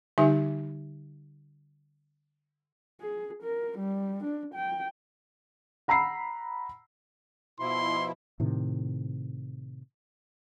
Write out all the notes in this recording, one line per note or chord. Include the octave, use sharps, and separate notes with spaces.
D3 G3 D#4 G4 E5 G#5
G#4
A#4
G3
D4
G5
F#5 A#5 B5 E6 C7
B2 F3 E4 C6
A2 C3 D#3